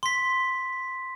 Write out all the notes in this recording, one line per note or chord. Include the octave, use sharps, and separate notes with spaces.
C6 B6